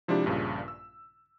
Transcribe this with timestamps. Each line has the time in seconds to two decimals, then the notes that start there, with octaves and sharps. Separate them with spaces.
0.08 C3 F3 G#3 D4 E4 G4
0.26 A#1 G2 A#2 C#3
0.68 E6